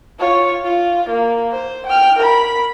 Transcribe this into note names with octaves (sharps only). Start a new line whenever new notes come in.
F4 C#5
F4
A#3
C5
G5 F6
A#4 B5